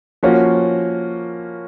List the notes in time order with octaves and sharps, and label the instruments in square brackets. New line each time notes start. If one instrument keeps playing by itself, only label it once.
[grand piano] F3 A#3 C#4 F#4